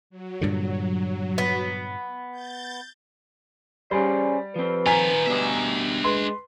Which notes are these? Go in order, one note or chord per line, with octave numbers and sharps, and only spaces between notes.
F#3
G2 A#2 D3
B3
G6 A6
G3 C#4 G#4 C5 D5
F3 C4 B4
D#3 F4 G#5 A#5 B6
B2 G3 D4 D#5 E5
G#3 B4 C6